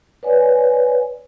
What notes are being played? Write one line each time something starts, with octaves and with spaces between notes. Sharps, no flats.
B4 C#5 D5 F#5 G#5